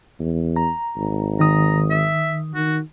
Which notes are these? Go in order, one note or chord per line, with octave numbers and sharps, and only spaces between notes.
E2
A#5
G#1
D#3 A#5 D#6
E5
D#3 F#4